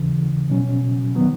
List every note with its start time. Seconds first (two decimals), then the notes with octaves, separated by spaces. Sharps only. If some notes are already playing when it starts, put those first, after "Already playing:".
Already playing: D#2 C#3 E3
0.50 B2 F#3 C#4
1.15 D#3 F#3 B3